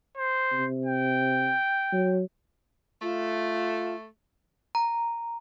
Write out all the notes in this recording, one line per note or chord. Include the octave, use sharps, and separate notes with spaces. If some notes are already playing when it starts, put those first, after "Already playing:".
C5
C3
G5
F#3
A3 F4
A#5